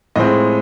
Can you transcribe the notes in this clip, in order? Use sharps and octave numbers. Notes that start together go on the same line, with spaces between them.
A2 F3 G#3 C4 D#5